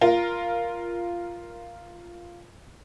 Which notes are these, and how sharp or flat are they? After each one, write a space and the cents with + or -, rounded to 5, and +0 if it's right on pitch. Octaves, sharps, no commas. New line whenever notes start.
F4 -5 A#4 +5